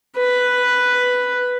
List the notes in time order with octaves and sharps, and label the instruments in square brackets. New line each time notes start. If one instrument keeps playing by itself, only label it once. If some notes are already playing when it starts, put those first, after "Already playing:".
[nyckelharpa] B4